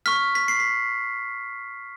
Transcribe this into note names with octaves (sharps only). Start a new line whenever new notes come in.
C#6 F6 B6
B6
C7
B6